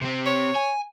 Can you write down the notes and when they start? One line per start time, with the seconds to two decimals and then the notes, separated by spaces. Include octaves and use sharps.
0.01 C3 C4
0.26 C#5
0.56 G#5